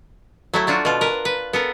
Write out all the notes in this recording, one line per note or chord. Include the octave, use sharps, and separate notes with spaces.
F#3 A3 E4
A3 D4 F4 F#4
B2 F4
A#4 B4 A#5
B4
B3 A4 A#4